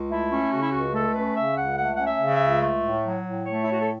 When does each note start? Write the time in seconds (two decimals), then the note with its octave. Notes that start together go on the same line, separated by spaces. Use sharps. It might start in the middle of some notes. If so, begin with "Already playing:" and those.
Already playing: C#2
0.09 A3 E4
0.31 C#4
0.51 C#3 F#4
0.60 E4
0.69 C#2 F#4
0.93 A3 A4
1.14 C#4 B4
1.35 C#3 E5
1.56 C#2 F#5
1.77 A3 F#5
1.94 C#4 F#5
2.05 E5
2.19 C#3
2.34 E5
2.41 C#2
2.61 A3
2.82 A2
3.03 F#3
3.25 A2
3.46 A3 C#5
3.62 E4
3.67 A2 F#4
3.79 A4